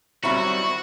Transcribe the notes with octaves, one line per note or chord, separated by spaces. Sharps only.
D#3 F#3 G3 C4 E4 F#4 C#6